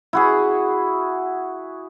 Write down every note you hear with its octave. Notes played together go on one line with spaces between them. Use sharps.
E4 F#4 G#4